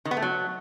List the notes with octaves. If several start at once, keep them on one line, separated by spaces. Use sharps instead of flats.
D#3
B3
A3
F#3